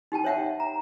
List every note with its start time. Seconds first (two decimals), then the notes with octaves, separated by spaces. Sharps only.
0.12 D#4 G4 G5 A5
0.24 C5 C#5 E5 F#5 G5
0.60 A#5